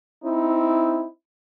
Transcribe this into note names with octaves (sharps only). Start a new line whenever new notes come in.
C4 D#4 E4